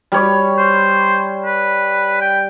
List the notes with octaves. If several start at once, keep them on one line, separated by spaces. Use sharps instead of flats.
G3 C#5
C5
B4
G5